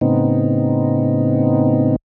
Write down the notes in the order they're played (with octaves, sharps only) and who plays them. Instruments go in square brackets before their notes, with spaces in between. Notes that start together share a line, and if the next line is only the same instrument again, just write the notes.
[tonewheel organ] A2 C#3 B3 C4 D#4